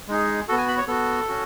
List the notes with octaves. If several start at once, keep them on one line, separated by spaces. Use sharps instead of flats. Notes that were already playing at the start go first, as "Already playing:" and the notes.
G#3 D#4 G#4
B3 F#4 A4
G#5
B5
C#5
B3 F#4 A4
C#4 F#4